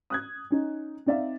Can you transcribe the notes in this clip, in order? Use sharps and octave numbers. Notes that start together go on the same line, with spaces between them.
D#6 F#6 G#6
C#4 D#4
C4 D#4 D5 E5 F5